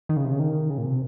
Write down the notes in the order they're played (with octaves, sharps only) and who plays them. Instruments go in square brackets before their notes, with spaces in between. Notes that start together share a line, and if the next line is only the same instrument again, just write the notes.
[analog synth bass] D#3
C#3
C3
C#3
D#3
C#3
A#2
C3